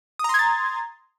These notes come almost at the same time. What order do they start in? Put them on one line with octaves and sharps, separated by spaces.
D#6 A#5 C6 G#6 A6